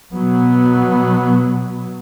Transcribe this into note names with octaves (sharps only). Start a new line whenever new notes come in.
B2 F#3 B3